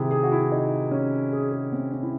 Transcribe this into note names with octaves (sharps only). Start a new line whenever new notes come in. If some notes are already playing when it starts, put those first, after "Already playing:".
Already playing: C3 D#3 E4 G#4
G#4
F#4
E4
D#4
C#4
G#4
G#4
C4
C#4
E4